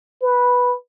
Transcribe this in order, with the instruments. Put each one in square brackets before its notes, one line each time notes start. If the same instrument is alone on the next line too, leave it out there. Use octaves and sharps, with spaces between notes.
[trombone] B4